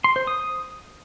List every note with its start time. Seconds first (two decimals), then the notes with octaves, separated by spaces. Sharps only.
0.04 C6
0.16 C5
0.27 D#6